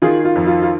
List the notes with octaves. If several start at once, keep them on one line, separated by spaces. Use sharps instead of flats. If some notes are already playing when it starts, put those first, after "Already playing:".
D#3 F4 G#4
F4
F2
F4
F4